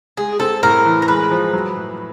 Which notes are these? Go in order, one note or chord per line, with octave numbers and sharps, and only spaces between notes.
G#3 G#4
C4 A4
A2 A#4
E3
A#4
G#3 B4
F3
F#3
A2